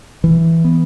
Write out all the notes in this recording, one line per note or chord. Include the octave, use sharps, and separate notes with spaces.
E3
B3